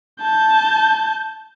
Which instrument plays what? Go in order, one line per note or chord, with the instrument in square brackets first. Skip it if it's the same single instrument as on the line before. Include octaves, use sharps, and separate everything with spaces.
[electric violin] A5 G6